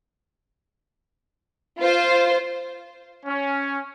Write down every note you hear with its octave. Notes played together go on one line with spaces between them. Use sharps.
F4 C5
C#4